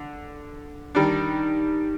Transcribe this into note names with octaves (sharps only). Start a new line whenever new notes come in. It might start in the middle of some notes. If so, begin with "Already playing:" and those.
Already playing: D3
D#3 G3 D4